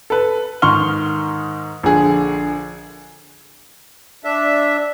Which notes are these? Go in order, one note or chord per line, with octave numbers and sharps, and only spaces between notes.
A4 B4
G#2 D#3 C6 C#6 F6 G7
A#1 D3 G#4
D4 E5